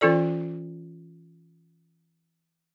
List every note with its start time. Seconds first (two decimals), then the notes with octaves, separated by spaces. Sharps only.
0.01 E3 C#4 F4 A4 D5